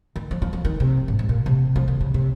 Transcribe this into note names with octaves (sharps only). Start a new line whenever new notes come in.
D#3
F3
F3
F3
D#3
C3
G#2
G#2
A#2
C3
F3
D#3
C#3
C3